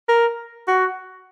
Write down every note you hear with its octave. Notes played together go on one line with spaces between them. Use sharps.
A#4
F#4